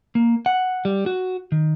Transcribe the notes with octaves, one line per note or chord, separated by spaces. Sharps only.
A#3
F#5
G3
F#4
D#3